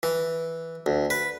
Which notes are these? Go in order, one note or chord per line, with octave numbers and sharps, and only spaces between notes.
E3
D2
B4